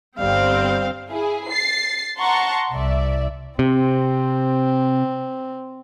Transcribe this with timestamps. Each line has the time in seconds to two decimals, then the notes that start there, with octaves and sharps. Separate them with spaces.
0.19 G1 G3 C4 F5
1.10 E4 G#4
1.51 A6 C7
2.19 F#5 A5 A#5 C6 C#6
2.73 C2 D5 E5
3.59 C3 C4